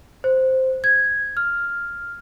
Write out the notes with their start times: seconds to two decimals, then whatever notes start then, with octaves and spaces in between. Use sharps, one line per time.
0.24 C5
0.84 G#6
1.37 F6